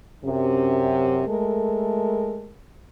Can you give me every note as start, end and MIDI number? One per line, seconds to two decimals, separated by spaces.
0.24 1.21 42
0.24 1.21 48
1.27 2.51 56
1.27 2.51 57
1.27 2.51 69
1.27 2.51 70